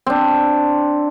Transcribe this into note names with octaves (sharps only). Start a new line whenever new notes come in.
C4 D4